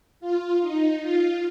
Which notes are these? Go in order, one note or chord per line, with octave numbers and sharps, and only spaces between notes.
F4
D#4
F4